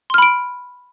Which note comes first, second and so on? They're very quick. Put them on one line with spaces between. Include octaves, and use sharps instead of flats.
C6 F6 B5 D7